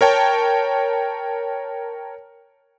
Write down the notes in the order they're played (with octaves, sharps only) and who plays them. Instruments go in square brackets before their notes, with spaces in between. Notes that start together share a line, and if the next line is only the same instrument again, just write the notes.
[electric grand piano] A#4 C#5 G5 A5